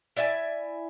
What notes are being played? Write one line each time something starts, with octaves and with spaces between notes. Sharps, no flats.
E4 D5 E5 G#5